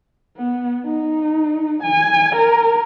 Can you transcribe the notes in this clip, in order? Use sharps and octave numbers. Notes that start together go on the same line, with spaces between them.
B3
D#4
G#5
A#4